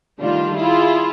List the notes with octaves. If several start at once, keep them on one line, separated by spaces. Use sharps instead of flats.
D#3 G3 A3 D4 F4
E4 F4 G#4